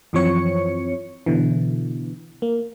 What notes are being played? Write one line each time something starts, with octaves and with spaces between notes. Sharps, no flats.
F#2 E3 F3 C4 C#5 C#7
B2 D3 E3
A#3